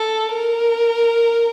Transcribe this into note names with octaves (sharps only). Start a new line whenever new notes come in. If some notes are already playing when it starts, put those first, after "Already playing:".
Already playing: A4
A#4